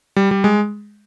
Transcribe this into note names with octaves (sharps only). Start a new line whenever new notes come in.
G3
G3
G#3